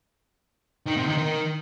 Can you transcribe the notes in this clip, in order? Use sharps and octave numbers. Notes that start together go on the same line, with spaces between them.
D#3
C3
D#3
D#3